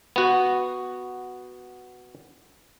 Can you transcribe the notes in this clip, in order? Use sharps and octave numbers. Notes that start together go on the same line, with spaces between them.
B3 F#4